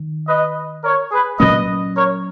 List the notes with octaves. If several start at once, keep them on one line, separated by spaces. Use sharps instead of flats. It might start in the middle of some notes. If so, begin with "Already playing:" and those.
Already playing: D#3
B4 D#5
A#4 C#5
G#4 B4
A#2 F#3 A#3 C#4 B4 D#5
A#4 C#5